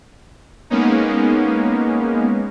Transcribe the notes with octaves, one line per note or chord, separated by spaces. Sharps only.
G#3 A#3 B3 C#4 D#4